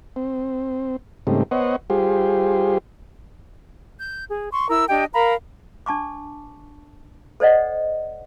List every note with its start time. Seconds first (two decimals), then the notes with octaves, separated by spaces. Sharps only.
0.16 C4
1.27 G#2 C#3 G3 A3 C4 D#4
1.51 B3 C5 C#5 D#5 F#5
1.90 G3 F4 G4 G#4 C5
3.99 G6
4.30 G#4
4.51 C6 C#6
4.70 E4 A#4 E6
4.89 D4 G4 D#5 G5
5.14 A#4 F5 A#5 B5
5.86 D4 A5 C#6 D6
7.40 A4 C5 D5 D#5 F#5